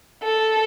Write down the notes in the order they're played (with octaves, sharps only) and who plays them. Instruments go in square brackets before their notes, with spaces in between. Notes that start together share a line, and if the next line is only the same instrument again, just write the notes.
[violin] A4